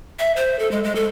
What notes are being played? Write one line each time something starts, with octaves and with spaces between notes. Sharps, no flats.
E5
C5
A4
G#3
G#3
A4